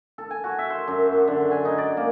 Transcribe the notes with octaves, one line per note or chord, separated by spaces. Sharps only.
A4
G#5
F#4
E5
C5
F#2
F#4
D3
G#5
D#4
D5
A#3